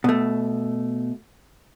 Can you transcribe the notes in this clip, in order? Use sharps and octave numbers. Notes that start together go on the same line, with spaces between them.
B2 A3